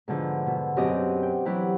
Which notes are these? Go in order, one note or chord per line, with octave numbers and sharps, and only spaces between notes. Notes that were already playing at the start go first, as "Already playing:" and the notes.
G#2 B2 D3 F3
B2
F#2 B2 C4 G4 G#4 D#5
G5
E3 F#3 E4 G4